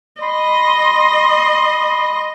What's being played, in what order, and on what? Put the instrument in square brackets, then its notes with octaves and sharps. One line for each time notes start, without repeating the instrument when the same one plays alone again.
[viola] D#5 [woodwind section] B5 C6